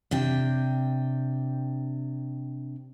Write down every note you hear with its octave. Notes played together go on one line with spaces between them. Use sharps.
C3 D4 G5